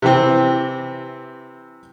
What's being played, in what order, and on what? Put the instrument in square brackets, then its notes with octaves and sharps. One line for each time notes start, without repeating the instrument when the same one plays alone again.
[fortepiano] C3 E3 C4